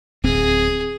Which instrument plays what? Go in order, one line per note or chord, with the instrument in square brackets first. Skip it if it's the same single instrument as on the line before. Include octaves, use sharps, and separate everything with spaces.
[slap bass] D1 C4 [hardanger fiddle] G#4